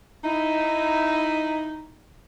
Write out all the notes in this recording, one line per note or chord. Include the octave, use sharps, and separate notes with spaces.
D#4 E4